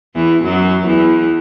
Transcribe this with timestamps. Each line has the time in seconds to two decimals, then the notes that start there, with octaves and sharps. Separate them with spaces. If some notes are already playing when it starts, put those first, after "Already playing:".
0.15 E2 E3
0.44 F#2 F#3
0.87 E2 E3